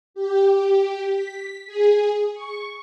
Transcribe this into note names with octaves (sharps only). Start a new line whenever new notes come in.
G4
B6
G#4
C#6